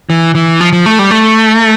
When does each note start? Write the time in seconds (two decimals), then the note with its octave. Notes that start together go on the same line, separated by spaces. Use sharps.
0.10 E3
0.35 E3
0.61 F3
0.73 F3
0.86 A3
0.99 G3
1.11 A3